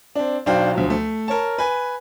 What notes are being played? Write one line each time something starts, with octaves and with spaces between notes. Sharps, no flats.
C4 D4
B1 D4 F#4 C5 F5 G5
D2 F3 F#3
A3
A#4 C#5 A5
B4 G#5